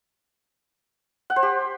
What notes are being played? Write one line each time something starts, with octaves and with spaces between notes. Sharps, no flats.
F#5
C5
G4